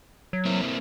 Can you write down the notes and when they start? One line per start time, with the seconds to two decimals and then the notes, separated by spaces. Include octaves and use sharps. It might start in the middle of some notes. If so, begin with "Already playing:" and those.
0.33 F#3
0.45 A#3 C4 E4